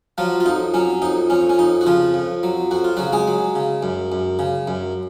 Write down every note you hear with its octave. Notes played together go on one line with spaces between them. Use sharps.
F3 F#3 F4
F4
F2 D#4
F#3 C#4
F2 D#4
F2 C#4
C#4
F2 D#4
F#4
C#3 F3 F4
F2
F#3
F2 F#4
F4
C#3 F#3 F#4
G#3 G#4
F#3
C#3
F#2
F#2
C#3
F#2